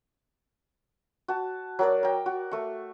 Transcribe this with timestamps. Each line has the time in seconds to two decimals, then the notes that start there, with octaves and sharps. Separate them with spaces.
1.28 F#4 A5
1.79 F#3 A#4 D5
2.03 A#4 G5
2.26 F#4
2.51 A3 C#6